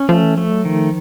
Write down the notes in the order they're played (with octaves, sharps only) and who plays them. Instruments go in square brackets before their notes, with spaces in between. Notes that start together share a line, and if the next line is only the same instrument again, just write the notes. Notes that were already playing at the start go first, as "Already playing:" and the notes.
Already playing: [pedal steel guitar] C#4
[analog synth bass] F3 [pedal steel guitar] A3
[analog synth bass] E3
[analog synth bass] F3 [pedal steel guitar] A3
[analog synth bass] F#3
[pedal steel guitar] D#3 [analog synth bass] F3